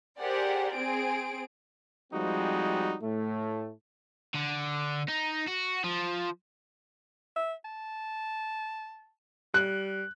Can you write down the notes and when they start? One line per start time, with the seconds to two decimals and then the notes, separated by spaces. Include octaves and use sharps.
0.20 G4 G#4 A#4 C5 D5 F#5
0.74 C4 G#4 D7
2.12 F3 G3 G#3 C4 D#4 F#4
3.02 A2 A3
4.34 D3
5.08 D#4
5.48 F#4
5.84 F3
7.36 E5
7.65 A5
9.54 G3 F#6